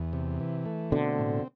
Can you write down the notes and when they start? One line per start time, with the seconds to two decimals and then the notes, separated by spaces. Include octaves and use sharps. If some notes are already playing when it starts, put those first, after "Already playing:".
Already playing: E2
0.13 C3
0.40 E3
0.66 A3
0.91 B2 D3 C4
1.18 A2